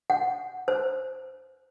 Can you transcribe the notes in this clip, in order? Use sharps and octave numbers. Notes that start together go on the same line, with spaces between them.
F#5
C5